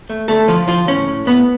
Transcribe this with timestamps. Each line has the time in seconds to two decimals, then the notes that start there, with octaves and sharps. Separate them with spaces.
0.10 A3
0.28 D3 A3 A4
0.48 D3 F3 F4
0.67 D3 F3 F4
0.88 A2 C#4
1.07 A2
1.26 A2 B3